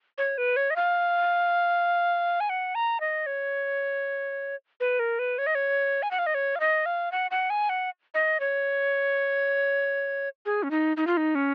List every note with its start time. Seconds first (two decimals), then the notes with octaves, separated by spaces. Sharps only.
0.18 C#5
0.38 B4
0.56 C#5
0.70 D#5
0.76 F5
2.40 G#5
2.50 F#5
2.75 A#5
3.00 D#5
3.26 C#5
4.80 B4
4.99 A#4
5.19 B4
5.38 C#5
5.47 D#5
5.55 C#5
6.03 G#5
6.11 F#5
6.19 F5
6.26 D#5
6.35 C#5
6.56 F5
6.60 D#5
6.86 F5
7.12 F#5
7.31 F#5
7.50 G#5
7.69 F#5
8.14 D#5
8.40 C#5
10.46 G#4
10.63 C#4
10.71 D#4
10.97 D#4
11.07 F4
11.17 D#4
11.35 C#4